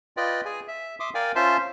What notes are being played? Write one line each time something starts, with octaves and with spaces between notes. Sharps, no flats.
F4 B4 D5 D#5 G5
G#4 G#5
E5
E5 C6 D6 D#6
A#4 D5 F5 G5 G#5
C#4 F4 C5 E5 A5 C6